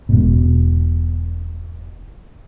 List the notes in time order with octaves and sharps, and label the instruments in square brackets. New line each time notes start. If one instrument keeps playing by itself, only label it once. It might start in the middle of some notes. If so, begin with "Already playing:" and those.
[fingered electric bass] E1 G#2 B2